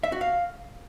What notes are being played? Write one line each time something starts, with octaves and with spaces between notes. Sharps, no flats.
E5
F#4
F5